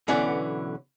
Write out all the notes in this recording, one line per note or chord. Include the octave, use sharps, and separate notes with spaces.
B1 D3 E3 B3 C#4